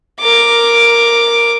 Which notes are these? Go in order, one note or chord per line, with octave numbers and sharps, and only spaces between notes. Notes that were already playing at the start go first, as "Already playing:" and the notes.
A#4 D6